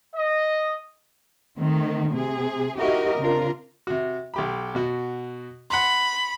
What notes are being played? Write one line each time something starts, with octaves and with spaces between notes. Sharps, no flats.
D#5
D#3 A3 C4
C3 G#4
D#4 E4 F#4 G4 A#4 D#5
C#3 C4 D4 F4 A#4
C3 F#4
B1 G4 B5
B2 F#4
F#5 B5 C6